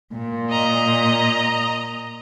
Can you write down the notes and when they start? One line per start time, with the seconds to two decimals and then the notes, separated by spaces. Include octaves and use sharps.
0.15 A#2
0.50 D#5 A#5